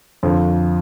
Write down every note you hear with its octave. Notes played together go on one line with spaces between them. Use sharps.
F2 D3 F3